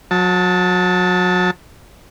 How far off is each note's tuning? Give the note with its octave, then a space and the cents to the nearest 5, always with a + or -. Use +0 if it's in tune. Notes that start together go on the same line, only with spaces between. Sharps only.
F#3 -35 A5 +0